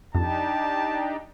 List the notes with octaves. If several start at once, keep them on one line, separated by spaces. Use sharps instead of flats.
F2 D4 D#4 G4 A5